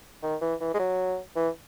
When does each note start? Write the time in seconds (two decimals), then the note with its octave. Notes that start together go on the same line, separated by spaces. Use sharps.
0.23 D#3
0.41 E3
0.61 E3
0.74 G#3
0.79 F#3
1.36 E3